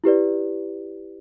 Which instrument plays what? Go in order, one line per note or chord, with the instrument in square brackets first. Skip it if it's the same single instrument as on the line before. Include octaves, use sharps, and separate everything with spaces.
[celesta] E4 G4 B4 D5